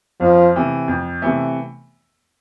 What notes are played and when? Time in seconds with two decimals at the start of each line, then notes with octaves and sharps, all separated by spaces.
0.20 F2 F3
0.55 C3 E3 A3
0.88 F2
1.22 C3 E3 A3